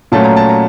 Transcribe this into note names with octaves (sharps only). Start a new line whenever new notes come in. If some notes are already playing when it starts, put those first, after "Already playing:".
A#2 F#3 A3 C#4 A5
A#5
A5
A#5